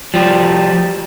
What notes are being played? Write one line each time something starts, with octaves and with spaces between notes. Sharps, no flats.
F3 G3